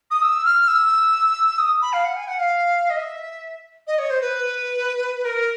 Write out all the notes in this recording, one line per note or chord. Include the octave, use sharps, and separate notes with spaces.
D#6
E6
F6
E6
D#6
B5
F5
F#5
G#5
F#5
F5
D#5
E5
D#5
C#5
C5
B4
A#4